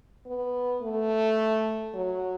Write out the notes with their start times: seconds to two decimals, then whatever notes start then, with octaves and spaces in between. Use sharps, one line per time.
0.26 B3
0.82 A3
1.94 F#3